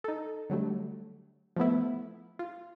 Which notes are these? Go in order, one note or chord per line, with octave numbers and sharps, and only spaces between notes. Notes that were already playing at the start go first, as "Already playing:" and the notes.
D#4 A4
D3 F#3 G3 A3
F3 A3 B3 E4
F4